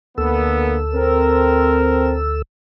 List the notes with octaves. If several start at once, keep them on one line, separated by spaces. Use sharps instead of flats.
D2 D3 A#3 B3 A4 E6
C4 A#4